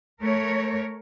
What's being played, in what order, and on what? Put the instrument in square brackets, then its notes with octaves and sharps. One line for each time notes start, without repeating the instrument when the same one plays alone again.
[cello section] A3 A#4 C#5